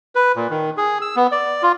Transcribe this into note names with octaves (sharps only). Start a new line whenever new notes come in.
B4
A#2
D#3
G#4
E6
B3
D5
F4